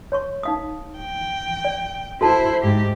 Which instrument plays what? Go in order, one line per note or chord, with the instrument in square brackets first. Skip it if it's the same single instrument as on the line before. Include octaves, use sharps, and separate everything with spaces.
[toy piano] C#5 C6 C#6
D#4 F5 D#6
[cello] G5
[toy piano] D5
[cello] E4 C5 [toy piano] F#4 A4 A5
[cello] G#2 G4